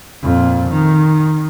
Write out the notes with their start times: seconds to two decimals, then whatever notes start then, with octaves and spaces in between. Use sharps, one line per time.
0.22 F2 A#2
0.69 D#3